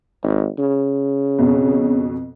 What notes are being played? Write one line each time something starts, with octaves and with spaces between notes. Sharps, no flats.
G#1
C#3
F2 B2